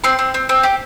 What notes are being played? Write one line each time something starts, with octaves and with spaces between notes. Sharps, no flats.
C4 C6
C4
C4
C4
G4